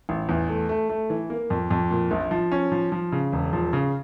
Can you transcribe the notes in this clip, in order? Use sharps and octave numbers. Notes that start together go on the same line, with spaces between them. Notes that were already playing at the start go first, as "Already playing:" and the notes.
A1
E2
A3
A3
A3
E3
A#3
F2
F2
A#2
A#1
F3
C#4
F3
F3
C#3
E1
F3
C#3